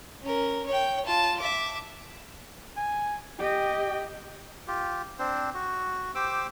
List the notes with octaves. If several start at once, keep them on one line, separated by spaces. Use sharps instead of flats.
C#4 A#4
C#5 G5
F4 A5
E5 D6
G#5
G4 D#5 G5
F4 G4
C4 D4 C5
F#4
G4 C5 D6 E6